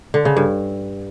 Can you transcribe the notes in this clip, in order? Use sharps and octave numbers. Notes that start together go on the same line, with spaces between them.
D3
C#3
G2